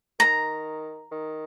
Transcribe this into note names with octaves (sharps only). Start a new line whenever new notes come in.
D#3 A#5
D#3